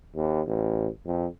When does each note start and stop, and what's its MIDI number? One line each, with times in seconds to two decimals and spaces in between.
0.15 0.42 39
0.47 0.88 33
1.06 1.26 41